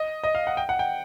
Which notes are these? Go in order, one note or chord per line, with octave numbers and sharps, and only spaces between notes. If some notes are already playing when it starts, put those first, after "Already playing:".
Already playing: D#5
D#5
F5
F#5
G5
F#5
G5